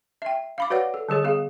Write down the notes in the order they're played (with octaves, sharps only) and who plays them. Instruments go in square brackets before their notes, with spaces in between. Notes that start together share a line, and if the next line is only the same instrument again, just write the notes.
[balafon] E5 G5
F5 B5 D6
F#4 B4 C#5 D5 F#5
A4
D3 G3 G#4 C#5
B3 G#4 F5